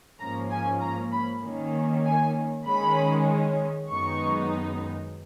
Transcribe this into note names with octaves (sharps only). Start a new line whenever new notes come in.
G#2 F3 A#3 C#4 A#5
G#5
A#5
B5
D#3 A#3 C#4
G#5
D#3 G#3 C#4 B5
F#2 D#3 G#3 B3 D#4 C#6